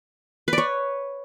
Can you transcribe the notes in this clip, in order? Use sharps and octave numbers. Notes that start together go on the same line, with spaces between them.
B4
D5
C#5